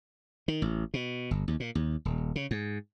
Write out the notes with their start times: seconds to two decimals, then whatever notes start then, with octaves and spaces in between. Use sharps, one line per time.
0.48 D#3
0.62 A1
0.94 B2
1.31 G1
1.48 D#2
1.60 A#2
1.75 D#2
2.05 D#1
2.36 C#3
2.51 G#2